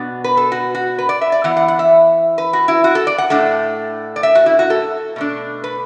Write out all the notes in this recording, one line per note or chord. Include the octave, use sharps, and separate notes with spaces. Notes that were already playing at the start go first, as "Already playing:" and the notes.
Already playing: B2 B3 D4 F#4
B4
A4
F#4
F#4
B4
D5
E5
D5
E3 B3 E4 F#5
F#5
F#5
E5
B4
F#4
E4
F#4
A4
D5
F#5
A2 A3 D4
D5
E5
F#4
E4
F#4
A4
B2 A3 D4
B4